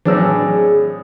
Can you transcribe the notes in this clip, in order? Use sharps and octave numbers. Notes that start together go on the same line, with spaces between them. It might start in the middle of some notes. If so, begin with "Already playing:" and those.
A2 E3 F#3 C4 D4 G#4 E6